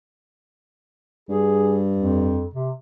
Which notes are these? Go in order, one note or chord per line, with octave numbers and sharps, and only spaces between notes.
G2 G#4
F2
C3